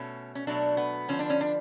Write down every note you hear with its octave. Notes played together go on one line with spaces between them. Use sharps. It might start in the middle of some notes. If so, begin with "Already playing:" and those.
Already playing: B2 A3 C#4
C#4
B2 F#3 A3 D4
B3
D3 F3 B3 C#4
D4
C#4
D4